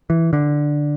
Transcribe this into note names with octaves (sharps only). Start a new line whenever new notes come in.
E3
D3